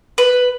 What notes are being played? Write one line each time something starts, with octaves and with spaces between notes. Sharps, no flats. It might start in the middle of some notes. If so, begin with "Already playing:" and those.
B4